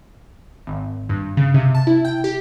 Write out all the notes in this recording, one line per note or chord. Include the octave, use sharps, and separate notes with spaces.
G#1
G2
C#3
C3
A5
E4
G5
G4